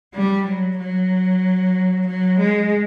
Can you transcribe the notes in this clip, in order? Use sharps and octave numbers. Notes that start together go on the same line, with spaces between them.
G3
F#3
F#3
F#3
G#3